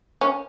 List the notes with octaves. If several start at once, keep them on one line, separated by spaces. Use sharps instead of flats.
C#4